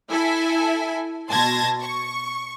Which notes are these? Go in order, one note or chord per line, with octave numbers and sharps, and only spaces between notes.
E4 A4 E5 G#5
B2 A5 C6 G#6 A#6
C#6